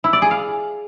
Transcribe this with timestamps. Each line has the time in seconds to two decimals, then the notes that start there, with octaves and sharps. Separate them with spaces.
0.04 E4
0.13 D5
0.22 G#4
0.31 F5